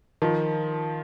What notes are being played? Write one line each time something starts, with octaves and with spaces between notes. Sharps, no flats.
D#3 F3